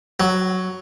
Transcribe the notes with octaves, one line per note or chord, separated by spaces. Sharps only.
F#3